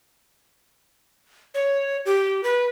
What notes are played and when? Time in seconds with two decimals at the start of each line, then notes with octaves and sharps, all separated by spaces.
1.55 C#5
2.06 G4
2.44 B4